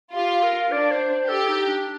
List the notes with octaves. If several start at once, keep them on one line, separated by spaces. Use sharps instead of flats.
F4 G4
A#4
D4 D5
C5
C5
G4 A4
D#4
D4